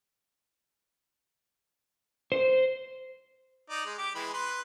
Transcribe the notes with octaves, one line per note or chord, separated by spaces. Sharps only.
C5
D#4 D5
G#3
G4 D6
E3 G#3 B5
B4 B5 C6